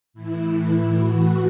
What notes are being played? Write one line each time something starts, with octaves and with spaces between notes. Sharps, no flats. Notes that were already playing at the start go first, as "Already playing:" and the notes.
A2 E3 E4
E4
A2 E3 F#4